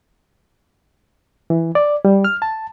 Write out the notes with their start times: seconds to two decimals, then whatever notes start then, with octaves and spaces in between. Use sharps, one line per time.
1.50 E3
1.75 D5
2.05 G3
2.24 F6
2.42 A5